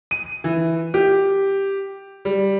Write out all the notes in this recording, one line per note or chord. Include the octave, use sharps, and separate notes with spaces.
D#7
E3
G4
G3